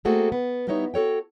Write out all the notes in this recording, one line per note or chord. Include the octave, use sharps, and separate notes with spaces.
A3 A#3 C4 F#4 G#4 A4
B3
G3 B3 D#4 E4 C#5
F#4 A4 C#5 G5